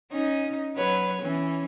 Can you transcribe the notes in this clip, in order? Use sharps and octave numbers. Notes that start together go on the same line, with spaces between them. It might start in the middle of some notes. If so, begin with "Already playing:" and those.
C#4 D#4
F#3 B4 C#5
E3 C#4